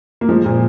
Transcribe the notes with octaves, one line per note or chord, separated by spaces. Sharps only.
A#3
F3 G#3
A#2